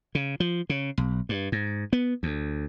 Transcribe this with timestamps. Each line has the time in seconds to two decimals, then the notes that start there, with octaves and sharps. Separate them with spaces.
0.15 C#3
0.40 F3
0.70 C#3
0.98 B1
1.29 G2
1.52 G#2
1.93 B3
2.23 D2